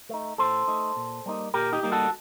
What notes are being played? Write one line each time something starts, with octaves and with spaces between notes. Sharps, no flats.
A3 D#4
A2 A4 C5
A3 D#4
A#2
G3 A#3 D#4
A#2 G4 A#4
D#4 G4
G3 A#3 D#4
F#4 A4